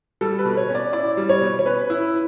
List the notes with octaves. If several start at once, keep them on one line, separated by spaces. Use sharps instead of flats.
G3 A4
B4
B2
C#5
C#4
D5
E4 D5
G3
C#5
B2
C#5
C#4 B4
E4